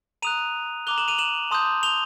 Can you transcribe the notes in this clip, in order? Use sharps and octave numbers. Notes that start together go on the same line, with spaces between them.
A#5 D#6 F#6 D#7 F7
A#5 D6 F#6 F7 G7
E7 F#7
D#7 F7
E7 F#7
A5 C6 D#6 G6
F7 G7